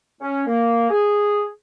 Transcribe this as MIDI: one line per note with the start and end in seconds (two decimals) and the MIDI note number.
0.21 0.42 61
0.47 0.90 58
0.90 1.48 68